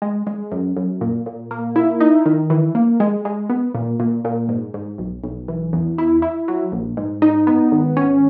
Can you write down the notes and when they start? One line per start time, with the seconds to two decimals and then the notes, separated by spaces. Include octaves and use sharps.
0.02 G#3
0.27 G#3
0.52 F#2
0.77 F#2
1.01 A#2
1.26 A#2
1.51 A#3
1.76 E4
2.00 D#4
2.26 D#3
2.50 E3
2.75 A#3
3.00 G#3
3.25 G#3
3.50 B3
3.75 A#2
4.00 A#2
4.25 A#2
4.49 G#2
4.74 G#2
4.98 B1
5.24 B1
5.48 E3
5.73 E2
5.98 E4
6.22 E4
6.48 F#3
6.72 A#1
6.97 G#2
7.22 D#4
7.47 B3
7.72 G#1
7.97 C#4